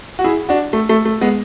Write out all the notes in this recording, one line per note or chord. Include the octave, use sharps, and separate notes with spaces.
F#4
E4 G#4
D4 F#4
A3
A3
A3
G#3 B3